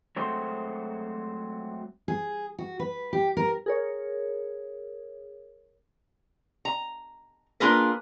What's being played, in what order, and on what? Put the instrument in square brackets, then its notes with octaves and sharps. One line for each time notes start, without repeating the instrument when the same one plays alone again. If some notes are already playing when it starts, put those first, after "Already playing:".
[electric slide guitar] F#3 G#3 A3 C4 F#4 C5
[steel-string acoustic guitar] G#4
F#4
B4
G4
A#4
[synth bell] G#4 A#4 C#5
[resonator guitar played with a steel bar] A#5
A#3 D4 F4 G#4 A#4 B4